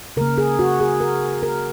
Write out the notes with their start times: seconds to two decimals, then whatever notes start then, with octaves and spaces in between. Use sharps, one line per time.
0.17 C#3 A#4
0.21 A#3
0.38 G#4
0.59 F#4
0.80 G#4
1.01 A#4
1.43 A#4